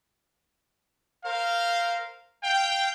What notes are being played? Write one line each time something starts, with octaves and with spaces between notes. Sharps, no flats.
A#4 C5 F5
F5 G5